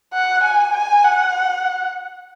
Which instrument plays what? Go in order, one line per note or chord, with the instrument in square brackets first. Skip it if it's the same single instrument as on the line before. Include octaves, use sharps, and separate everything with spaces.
[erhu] F#5
G#5
G#5
F#5